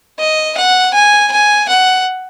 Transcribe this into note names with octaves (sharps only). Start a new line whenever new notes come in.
D#5
F#5
G#5
G#5
F#5